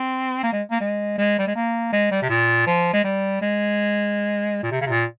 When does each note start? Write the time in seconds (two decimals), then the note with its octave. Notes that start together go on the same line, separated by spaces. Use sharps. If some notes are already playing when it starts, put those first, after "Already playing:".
Already playing: C4
0.43 A#3
0.52 G#3
0.71 A#3
0.81 G#3
1.18 G#3
1.39 G3
1.47 G#3
1.55 A#3
1.92 G#3
2.11 G3
2.22 C3
2.29 A#2
2.66 F3
2.93 G#3
3.04 G3
3.41 G#3
4.63 A#2
4.71 C3
4.81 C#3
4.87 C3
4.90 A#2